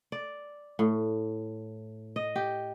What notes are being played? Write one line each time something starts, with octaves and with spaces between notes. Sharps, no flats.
D5
A2
D#5
G4